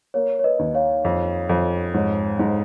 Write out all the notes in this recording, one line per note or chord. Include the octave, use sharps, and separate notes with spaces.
A#3 C#5
C#5
B4 D#5
D#2
C#5 F5
F2
F2
G#2 C#5
G#2